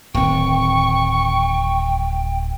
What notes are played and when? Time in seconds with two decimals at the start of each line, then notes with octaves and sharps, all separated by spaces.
0.14 D1 D#3 C4 G5 C#6